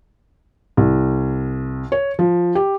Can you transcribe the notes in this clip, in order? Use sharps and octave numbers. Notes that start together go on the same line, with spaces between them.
C2
C#5
F3
G4